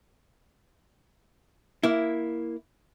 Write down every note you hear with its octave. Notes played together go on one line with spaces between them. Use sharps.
A#3 E4